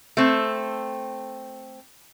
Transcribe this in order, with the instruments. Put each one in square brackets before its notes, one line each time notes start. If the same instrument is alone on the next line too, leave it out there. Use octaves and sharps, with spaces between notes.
[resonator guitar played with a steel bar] A3 C4